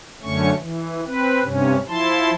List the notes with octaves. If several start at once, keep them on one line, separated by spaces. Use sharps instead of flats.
F#2 D3 A3 C#4 C#6
E3
C4 B4
G2 C3 C#4
F3 E4 A5 C6